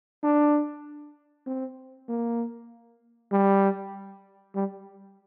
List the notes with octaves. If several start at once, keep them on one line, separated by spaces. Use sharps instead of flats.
D4
C4
A#3
G3
G3